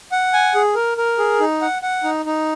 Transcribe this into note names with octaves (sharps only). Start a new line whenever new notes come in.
F#5
G#5
G#4
A#4
A#4
G#4
D#4
F#5
F#5
D#4
D#4